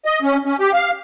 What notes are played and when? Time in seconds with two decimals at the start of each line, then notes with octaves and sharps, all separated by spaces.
0.05 D#5
0.22 C#4
0.45 C#4
0.60 G4
0.73 F5